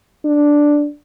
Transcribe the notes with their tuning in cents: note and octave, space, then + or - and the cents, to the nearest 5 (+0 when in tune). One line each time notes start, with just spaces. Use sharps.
D4 +0